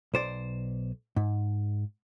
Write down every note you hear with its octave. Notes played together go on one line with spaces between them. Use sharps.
B1 C5 D5
G#2